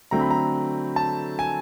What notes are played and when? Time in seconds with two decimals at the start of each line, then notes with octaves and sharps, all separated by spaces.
0.11 D3 F#3 A3 C4 A#5
0.21 B5
0.31 A#5
0.96 A5
1.39 G#5